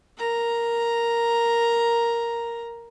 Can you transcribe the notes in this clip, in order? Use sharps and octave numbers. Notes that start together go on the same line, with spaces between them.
A#4 A#5